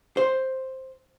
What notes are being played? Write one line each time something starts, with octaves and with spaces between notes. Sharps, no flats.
C5